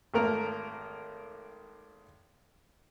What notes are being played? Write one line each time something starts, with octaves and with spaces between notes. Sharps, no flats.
G#1 A3 A#3 A#4 F6